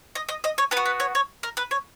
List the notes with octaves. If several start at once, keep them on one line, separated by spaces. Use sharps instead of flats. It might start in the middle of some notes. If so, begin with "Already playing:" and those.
D#5
D#5
D#5
C#5
B3 B4
F#4
B4
C#5
C#5
A#4
B4
C#5